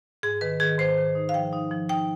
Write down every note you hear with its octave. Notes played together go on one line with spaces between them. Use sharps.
G#2 G#4
D#3 B4
D#3 G#4
G#2 C5
D#3
D#4
F5
F3 G5
D#4
F3
D#4 G5